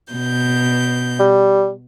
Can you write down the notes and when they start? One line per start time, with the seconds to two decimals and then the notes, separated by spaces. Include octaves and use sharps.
0.12 B2 G6
1.19 G3